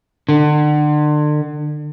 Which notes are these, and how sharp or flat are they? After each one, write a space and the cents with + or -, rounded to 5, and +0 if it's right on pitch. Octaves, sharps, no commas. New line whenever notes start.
D3 +35